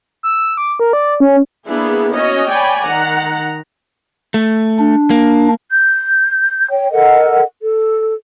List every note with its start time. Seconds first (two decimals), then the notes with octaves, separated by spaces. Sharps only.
0.23 E6
0.57 D6
0.80 A#4
0.93 D5
1.20 C#4
1.66 A#3 B3 D4 E4 G#4
2.13 C#4 F#4 C#5 D#5
2.49 C#5 D5 G5 G#5 B5
2.84 D#3 F#5 A#5
4.34 A3
4.79 D4
5.10 A#3
5.71 G6
6.70 C#5 G5
6.91 A4 A#4 D#5 F#5
7.61 A4